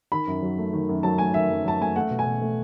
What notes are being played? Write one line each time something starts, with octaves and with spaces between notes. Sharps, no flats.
D#3 B5
F#2
F#3
A3
D#3
F#2
F#3 A5
A3 G#5
D#3 E5
F#2
F#3 A5
A3 G#5
A3 F#5
B2
G#5
B2
A3